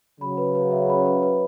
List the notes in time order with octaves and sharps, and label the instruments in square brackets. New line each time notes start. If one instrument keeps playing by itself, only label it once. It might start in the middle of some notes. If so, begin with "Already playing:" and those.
[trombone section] C#3 F#3 [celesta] B5
[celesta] B4
B4
E5
B5
B4
B4